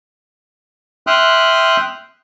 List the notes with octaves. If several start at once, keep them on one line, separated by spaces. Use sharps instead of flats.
E5 G5 C6 D#6 F6 F#6